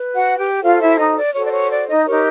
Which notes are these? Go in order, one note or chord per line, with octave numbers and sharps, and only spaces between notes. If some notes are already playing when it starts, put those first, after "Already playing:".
Already playing: B4
F#4 F#5
G4 G5
F4 F#4 A4 C5 F5
E4 E5
D#4 D#5
D5
F#4 A4 C5 C#5
D5
C#5
D5
D#4 D#5
D#4 G4 A#4 C#5